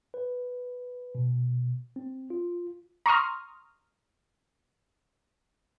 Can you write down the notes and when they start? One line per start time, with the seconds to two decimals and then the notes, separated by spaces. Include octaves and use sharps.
0.14 B4
1.15 B2
1.96 C4
2.30 F4
3.06 A#5 C6 C#6 D#6 F6